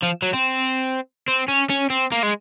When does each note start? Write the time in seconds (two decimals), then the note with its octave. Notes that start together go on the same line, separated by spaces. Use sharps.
0.02 F3
0.22 F#3
0.33 C4
1.28 C4
1.48 C#4
1.70 C#4
1.90 C4
2.12 A#3
2.23 G#3